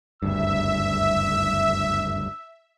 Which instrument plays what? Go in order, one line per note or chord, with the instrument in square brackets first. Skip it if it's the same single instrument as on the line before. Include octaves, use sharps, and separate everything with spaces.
[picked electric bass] F#1 D2 G2 [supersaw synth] E5 [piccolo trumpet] E6